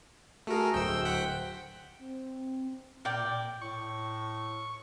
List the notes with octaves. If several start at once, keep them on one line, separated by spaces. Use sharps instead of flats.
A3 F#4 G#4 A#4
D1 C5 G5 E6
F#5 G5 B6
C4
A#2 A#4 D5 G5
A2 C#6